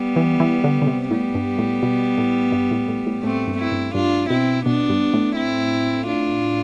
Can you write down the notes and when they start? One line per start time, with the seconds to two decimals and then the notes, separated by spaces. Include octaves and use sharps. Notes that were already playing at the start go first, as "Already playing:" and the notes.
Already playing: G3 B3
0.16 E3
0.40 E3
0.64 D3
0.82 D3
0.87 C3
1.11 A2 G3 B3
1.35 G2
1.58 A2
1.82 B2
2.18 A2
2.52 G2
2.71 A2
2.88 A2
3.06 A2
3.23 A2 A3 C4
3.47 G2
3.59 C4 E4
3.72 G2
3.94 G2 D4 F4
4.30 B2 C4 E4
4.65 B2 B3 D4
4.89 G2
5.13 A2
5.36 C4 E4
6.07 D4 F4